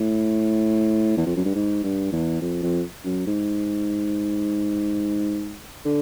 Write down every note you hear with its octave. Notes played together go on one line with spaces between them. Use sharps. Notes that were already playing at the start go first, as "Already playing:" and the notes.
Already playing: A2
E2
F2
F#2
G2
G#2
G2
E2
F2
F2
F#2
G#2
D3